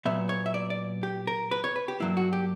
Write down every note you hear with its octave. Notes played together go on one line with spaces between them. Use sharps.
A#2 F#3 B3 E5
C#5
E5
D5
D5
G4
A#4
B4
C#5
B4
G4
G2 F#3 A#3 E4
F#4
G4